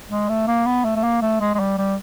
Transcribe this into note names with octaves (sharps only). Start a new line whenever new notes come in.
G#3
A3
A#3
B3
A3
A3
A#3
A3
G#3
G#3
G3
G3